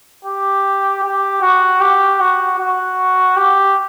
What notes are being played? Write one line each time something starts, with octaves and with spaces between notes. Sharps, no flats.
G4
G4
F#4
G4
F#4
F#4
G4